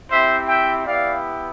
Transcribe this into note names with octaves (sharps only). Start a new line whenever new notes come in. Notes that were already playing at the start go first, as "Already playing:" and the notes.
C4 E4 G4 C5 E5
E5 G5
B3 E4 G4 D5 F5